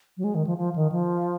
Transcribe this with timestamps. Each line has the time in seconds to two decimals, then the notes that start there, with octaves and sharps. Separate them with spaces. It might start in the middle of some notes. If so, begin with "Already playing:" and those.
0.17 F#3
0.24 G#3
0.35 D#3
0.47 F3
0.58 F3
0.76 D#3
0.92 F3